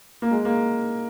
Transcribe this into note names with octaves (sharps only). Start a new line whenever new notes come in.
A#3
G#3
A#3